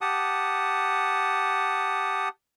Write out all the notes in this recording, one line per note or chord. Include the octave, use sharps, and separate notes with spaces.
G4 F#5 A5 D#6